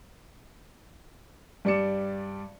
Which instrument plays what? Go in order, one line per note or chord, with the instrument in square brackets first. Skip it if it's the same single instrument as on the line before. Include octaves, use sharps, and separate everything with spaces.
[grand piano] G2 G3 D5 D6 C#7 E7